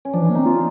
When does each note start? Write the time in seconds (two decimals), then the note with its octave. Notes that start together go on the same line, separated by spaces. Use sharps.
0.05 C#4
0.13 F3 D4
0.21 E3
0.25 A#3 D4
0.35 C4 D#4
0.46 F4